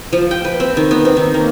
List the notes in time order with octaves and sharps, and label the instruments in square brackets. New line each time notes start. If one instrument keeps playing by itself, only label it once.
[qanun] F3
G5
B4
C4
D#3
B3
C4
D#3
A#3